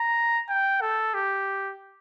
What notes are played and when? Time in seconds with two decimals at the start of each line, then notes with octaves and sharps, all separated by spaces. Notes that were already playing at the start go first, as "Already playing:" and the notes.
Already playing: A#5
0.49 G5
0.81 A4
1.14 G4